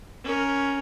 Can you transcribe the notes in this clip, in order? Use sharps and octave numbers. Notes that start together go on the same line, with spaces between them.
C#4 A#4